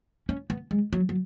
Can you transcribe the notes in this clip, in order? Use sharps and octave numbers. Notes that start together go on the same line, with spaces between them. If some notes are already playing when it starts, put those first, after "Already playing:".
C#4
B3
G#3
F#3
F#3